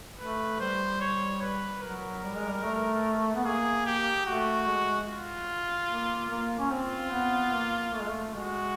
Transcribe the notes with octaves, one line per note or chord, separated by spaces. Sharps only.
A3 B4
G3 C5
C#5
B4
F#3 A#4
G3
G#3
G3
A3
B3
A#3 G#4
G4
A3 F#4
G#3
F4
A#3
A#3
C#4
C4 F4
B3
A#3
A3
G#3
A3
G#3 F#4